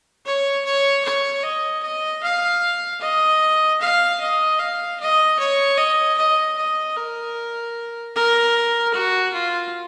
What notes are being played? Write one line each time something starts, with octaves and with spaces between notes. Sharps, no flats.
C#5
C#5
C#5
D#5
D#5
F5
D#5
F5
D#5
F5
D#5
C#5
D#5
D#5
D#5
A#4
A#4
F#4
F4